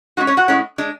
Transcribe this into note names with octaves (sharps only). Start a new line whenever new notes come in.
A2 G#3 C#4 F#4
C#4 C#5
F#4 F#5
A2 G#3 C#4
G#3 D4